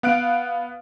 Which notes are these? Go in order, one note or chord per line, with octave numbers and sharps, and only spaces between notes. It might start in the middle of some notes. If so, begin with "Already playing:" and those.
B3 F5 F#6 D7